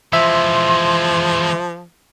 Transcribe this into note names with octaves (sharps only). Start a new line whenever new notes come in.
E3 F3 G#3 E5 C6